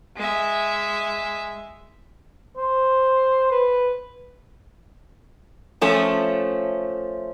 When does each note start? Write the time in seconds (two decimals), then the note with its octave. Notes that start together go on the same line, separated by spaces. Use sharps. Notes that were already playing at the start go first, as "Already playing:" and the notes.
0.16 G#3 E5
2.57 C5
3.51 B4
5.81 F3 A3 C#4